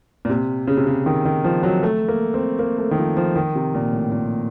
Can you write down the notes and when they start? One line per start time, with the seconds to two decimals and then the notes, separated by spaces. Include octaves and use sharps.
0.25 A#2
0.29 C3
0.67 C#3
0.77 C3
0.87 C#3
1.06 D#3
1.25 D#3
1.44 F3
1.63 F#3
1.83 A3
2.08 A#3
2.34 C4
2.59 A#3
2.78 A3
2.91 D#3
2.98 F3
3.17 F3
3.36 D#3
3.55 C3
3.75 A#2
3.93 A2
4.12 A#2